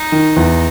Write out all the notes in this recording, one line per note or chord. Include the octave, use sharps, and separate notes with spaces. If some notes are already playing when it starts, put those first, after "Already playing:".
Already playing: D#4
D#3
E2